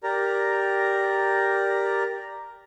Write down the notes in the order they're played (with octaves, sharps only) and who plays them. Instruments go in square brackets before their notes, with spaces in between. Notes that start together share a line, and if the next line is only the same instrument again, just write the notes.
[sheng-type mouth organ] G4 A#4 D5 A#5